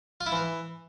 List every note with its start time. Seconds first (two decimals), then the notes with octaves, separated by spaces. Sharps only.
0.21 F4
0.26 E4
0.32 E3